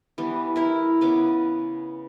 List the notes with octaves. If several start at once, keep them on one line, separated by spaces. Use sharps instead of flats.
E3 G3 B3
E4 A#4
C#3 B3 C#4 D6